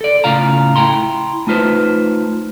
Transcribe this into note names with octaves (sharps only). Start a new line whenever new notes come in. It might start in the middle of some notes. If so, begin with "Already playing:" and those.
A4 D5
A2 C#3 F4 F5 A#5
E4 G5 A#5 C6
A3 D#4 F4 B4 C5